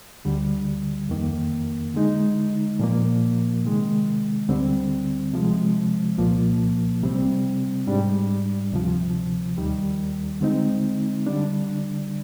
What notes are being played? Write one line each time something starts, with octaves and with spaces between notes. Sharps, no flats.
D2 D3 G3
F2 D#3 A#3
D3 G#3 D#4
A#2 F3 A#3
C3 D#3 G#3
D2 D3 G3 C4
C3 F3 G#3
C2 A#2 F3 A#3
C3 G3 C4
G#2 G3 D4
D2 C3 F3
D#2 D#3 G3
D3 G#3 C4 D#4
D3 G3 D4